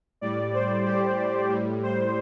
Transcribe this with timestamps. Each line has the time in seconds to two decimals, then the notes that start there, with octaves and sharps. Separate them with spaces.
0.21 A2 G3 D5
0.54 C5
0.85 G4
1.50 A2 G3
1.83 C5